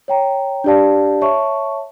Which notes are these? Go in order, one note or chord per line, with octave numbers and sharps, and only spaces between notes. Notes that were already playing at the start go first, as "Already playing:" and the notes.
C#5 G5 A#5
D4 G4 D5 F5 A5
C#5 E5 A5 C#6